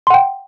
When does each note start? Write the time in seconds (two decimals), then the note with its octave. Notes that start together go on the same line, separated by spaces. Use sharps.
0.07 C6
0.10 F#5
0.14 G5